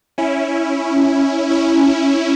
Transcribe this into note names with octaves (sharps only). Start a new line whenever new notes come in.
C#4 E4
C#4 E4